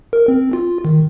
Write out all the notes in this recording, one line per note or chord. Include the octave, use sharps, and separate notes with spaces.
A#4
C4
F4
D#3